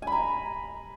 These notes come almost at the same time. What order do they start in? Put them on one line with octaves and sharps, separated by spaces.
G#5 B5 A#5